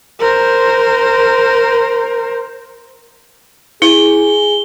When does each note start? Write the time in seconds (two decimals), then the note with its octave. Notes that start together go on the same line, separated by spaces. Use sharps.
0.20 A#4 C5
3.82 E4 G#4 G7